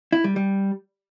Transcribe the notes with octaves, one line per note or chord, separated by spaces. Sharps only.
E4
G3
G3